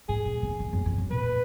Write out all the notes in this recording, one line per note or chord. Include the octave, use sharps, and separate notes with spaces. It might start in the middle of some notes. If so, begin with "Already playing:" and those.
G#2 G#4
A#2
D3
D#3
F#2
F2
F#2
A#2 B4